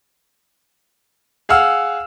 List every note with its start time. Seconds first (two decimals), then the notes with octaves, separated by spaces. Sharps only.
1.49 G#4 F5 F#5 E6 F6